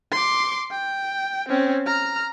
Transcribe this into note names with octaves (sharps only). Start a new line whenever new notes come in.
C6 D6
G5
C4 C#4
A#5 F6